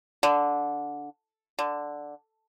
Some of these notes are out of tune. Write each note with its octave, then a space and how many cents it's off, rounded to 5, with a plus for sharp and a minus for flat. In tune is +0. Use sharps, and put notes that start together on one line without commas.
D3 -10
D3 +0